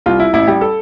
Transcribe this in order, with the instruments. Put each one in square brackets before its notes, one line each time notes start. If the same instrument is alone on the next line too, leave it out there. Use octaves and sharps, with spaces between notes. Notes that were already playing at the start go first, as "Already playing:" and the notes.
[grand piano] C2 F4
E4
A1 E4
G3 G4
A4